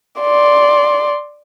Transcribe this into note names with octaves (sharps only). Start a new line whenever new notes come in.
D5 C6